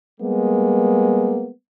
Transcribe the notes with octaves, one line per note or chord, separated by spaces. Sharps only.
G3 G#3 A#3 B3